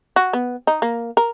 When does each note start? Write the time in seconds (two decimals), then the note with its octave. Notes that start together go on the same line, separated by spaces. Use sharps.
0.16 F#4
0.33 B3
0.67 D#4
0.82 A#3
1.17 A#4